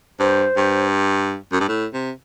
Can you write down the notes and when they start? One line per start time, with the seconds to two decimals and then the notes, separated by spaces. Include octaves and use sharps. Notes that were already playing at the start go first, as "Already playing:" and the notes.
0.20 G2 C5
0.57 G2
1.52 F#2
1.60 G2
1.68 A2
1.93 C3